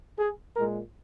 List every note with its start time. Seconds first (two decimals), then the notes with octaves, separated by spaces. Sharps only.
0.18 G#4
0.54 A#2 G#3 A#4